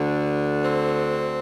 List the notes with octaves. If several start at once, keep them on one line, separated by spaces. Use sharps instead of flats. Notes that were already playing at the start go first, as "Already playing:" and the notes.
Already playing: D2 D3
C4